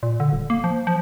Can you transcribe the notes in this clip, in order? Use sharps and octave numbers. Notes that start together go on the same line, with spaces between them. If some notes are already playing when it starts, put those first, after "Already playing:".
A#2
D3
D#1
A#3
F3
F3